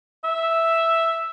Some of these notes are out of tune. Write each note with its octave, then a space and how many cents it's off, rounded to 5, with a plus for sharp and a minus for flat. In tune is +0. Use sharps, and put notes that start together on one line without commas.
E5 +0